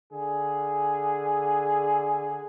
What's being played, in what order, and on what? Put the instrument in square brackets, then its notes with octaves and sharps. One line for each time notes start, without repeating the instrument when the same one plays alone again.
[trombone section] D3 G#4